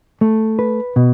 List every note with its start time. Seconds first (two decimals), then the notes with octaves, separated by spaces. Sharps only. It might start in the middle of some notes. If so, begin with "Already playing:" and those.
0.21 A3
0.59 B4
0.96 B2